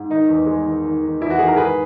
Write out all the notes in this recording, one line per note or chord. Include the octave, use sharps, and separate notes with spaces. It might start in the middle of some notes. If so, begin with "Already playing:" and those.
Already playing: G#2
D#3 D#4
E2
G#3
D#3
D#3
D#3
E2 E4
F#4
D#3 G#4
A#4
G#2 G#4 B4